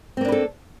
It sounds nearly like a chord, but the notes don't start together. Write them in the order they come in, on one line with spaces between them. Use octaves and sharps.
C4 A#3 D4 B4 A4